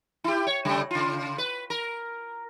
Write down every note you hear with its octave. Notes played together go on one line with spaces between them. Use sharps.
E4 G4
C#5
C#3 G3 A3
C#3 F4
B4
A#4